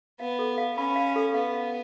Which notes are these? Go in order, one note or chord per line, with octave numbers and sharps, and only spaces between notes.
B3 F5
A4
F5
C#4 B5
F5
A4
B3 F5
F5